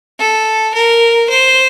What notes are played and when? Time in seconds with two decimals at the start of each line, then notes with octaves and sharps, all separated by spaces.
0.19 A4
0.74 A#4
1.30 C5